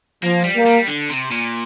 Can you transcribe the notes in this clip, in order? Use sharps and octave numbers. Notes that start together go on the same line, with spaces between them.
F3 A#3
G3
A#3
G3
D3
C3
A#2